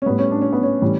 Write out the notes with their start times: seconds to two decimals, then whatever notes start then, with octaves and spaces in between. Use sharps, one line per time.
0.02 C#4
0.06 A2 G3 B3
0.19 C#4
0.31 D4
0.42 C#4
0.53 B3
0.63 C#4
0.82 A2 E3 G3